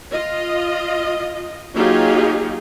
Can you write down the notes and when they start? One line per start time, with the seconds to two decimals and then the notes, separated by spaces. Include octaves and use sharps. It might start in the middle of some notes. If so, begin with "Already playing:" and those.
0.10 F4 D#5
1.75 F#3 A#3 D#4 F4 G4 G#4